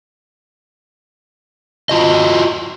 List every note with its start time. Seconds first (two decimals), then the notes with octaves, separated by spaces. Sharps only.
1.89 F4 F#4 D#5